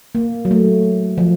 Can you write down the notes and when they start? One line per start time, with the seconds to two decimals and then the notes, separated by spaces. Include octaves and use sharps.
0.15 A#3
0.45 F#3
0.51 A3
1.18 F3